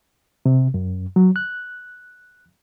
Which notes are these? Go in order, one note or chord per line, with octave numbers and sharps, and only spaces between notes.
C3
F#2
F#3
F#6